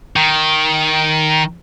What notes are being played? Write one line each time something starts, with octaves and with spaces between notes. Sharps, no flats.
D#3